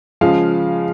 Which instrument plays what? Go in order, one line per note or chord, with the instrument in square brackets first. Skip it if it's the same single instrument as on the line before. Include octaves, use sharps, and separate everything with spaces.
[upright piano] C#3 F3 G#3 F5